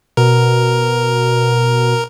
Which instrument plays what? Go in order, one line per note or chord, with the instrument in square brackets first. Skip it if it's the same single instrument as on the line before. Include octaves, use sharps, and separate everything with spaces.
[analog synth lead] B2 [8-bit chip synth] A#4